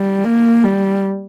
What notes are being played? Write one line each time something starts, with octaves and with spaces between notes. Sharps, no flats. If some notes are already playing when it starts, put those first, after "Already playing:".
Already playing: G3
A#3
G3